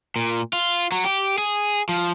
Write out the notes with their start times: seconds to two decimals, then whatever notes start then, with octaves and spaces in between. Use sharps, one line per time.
0.16 A#2
0.53 F4
0.92 F#3
1.05 G4
1.38 G#4
1.89 F3